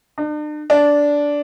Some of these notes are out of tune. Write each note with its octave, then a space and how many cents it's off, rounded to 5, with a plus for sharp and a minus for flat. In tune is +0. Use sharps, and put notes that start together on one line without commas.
D4 +45
D4 -10